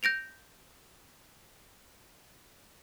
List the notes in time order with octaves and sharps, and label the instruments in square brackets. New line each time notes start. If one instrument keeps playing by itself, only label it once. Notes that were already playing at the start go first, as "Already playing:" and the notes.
[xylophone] G6 A#6 D7 F7